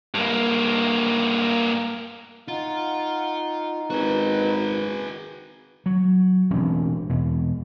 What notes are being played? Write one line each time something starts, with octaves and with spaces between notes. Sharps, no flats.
G2 A#3
D#4 F4 F#5
G#1 F#4 G#4 B4
F#3
E1 A1 C4 D4
E2 B2